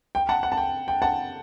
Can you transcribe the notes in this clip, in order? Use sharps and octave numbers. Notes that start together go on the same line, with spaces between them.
G5
F#5 A5
F#5
A5
G5
G5
F#5 A5